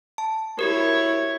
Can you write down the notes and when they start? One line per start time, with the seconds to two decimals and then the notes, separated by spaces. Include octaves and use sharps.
0.18 A5
0.59 E4 F#4 G4 A#4 C#5